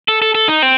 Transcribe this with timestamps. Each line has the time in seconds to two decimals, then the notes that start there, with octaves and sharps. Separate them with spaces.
0.08 A4
0.22 A4
0.35 A4
0.48 D#4
0.62 C4